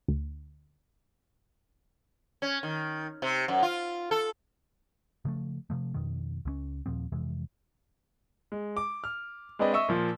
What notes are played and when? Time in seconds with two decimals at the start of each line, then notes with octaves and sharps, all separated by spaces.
0.08 D2
2.42 C#4
2.63 D#3
3.22 C3
3.48 F#2
3.63 F4
4.11 A4
5.25 C#3 F3 F#3 A3
5.70 C3 F3 A3
5.94 F2 B2 D#3
6.45 C#2 G3 C#4
6.86 D#2 A#2 F3 C4
7.12 F2 C3 E3 G#3
8.52 G#3
8.77 D6
9.04 F6
9.59 G#3 C4 D4 B4 D#5
9.73 D#5 E5 C#6 E6
9.88 A#2 F3